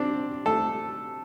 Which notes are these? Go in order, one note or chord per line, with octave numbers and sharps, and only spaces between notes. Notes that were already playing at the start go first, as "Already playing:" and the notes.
Already playing: C4 D4 D5
A3 A4